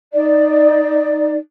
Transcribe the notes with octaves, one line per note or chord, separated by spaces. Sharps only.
D#4 D5